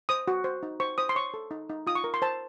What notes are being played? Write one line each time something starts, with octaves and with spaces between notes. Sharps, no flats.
C5 D#6
F#4
C5
D#4
C5 C#6
C5 D#6
C6
C#5 C#6
A4
D#4
D#4
F4 D#6
C#6
A#4
C6
C5 A5